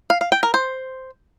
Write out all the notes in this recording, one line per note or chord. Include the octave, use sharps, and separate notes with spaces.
F5
F5
G5
A#4
C5